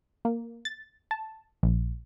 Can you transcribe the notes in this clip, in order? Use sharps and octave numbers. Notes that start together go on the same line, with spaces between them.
A#3
A6
A5
A#1